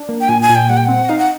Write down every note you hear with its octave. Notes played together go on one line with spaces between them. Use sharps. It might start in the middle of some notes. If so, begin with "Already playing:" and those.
Already playing: D4
A#3
G5
A#2 G#5
G#5
A#2
G5
G3 F#5
G5
C4 F#5
D#4 F5
F#5